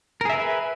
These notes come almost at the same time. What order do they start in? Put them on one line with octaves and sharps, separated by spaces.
A#4 G#4 E5 B4